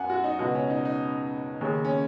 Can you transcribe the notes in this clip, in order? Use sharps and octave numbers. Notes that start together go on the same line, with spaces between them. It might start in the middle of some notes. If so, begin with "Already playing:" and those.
Already playing: F#2 F#5 G#5
F#4
D#4
C#2 B2 F#4
C#4
D#4
D#4
D#2 C#3 C#4
C#4